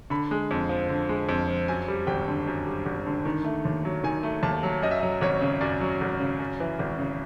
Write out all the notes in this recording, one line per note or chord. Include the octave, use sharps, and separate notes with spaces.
D3 B5
G#3
F2
F3
D3
G#3
F2
F3
F#2 G#5
G3
G#1 G5
D3
F#2
G3
G#1
D3
D#3
A3
D#2
F#3
D#3 G#5
A3
D#2 A5
F#3
F#2 D#5
E5
F#3 D#5
G#1 C#5
C#3
F#2 D5
F#3
G#1
C#3
F#2
E3
G#1
C#3